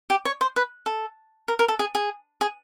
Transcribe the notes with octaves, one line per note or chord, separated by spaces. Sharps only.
G4
C#5
C5
B4
A4
A#4
A#4
A4
G#4
G#4
G#4